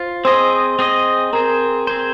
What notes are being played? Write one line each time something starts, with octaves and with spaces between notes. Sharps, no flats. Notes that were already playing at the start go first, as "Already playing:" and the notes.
Already playing: F4 C5
C4 G#4 C5 D#5 C6
C4 G#4 D#5
C4 G#4 A#4 C5 A#5
C4 G#4 C5